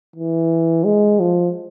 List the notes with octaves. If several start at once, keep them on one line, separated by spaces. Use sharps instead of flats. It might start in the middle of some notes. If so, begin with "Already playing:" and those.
E3
G#3
F3